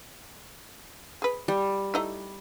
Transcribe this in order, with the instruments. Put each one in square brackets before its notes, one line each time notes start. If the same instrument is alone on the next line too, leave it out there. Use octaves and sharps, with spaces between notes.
[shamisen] G#4 B4
[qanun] G3
[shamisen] A3 D#4 E4